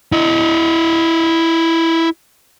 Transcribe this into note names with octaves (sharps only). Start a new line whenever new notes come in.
E4 D#5